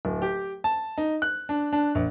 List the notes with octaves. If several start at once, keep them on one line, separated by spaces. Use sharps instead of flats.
D1
G4
A5
D#4
F#6
D4
D4
A#1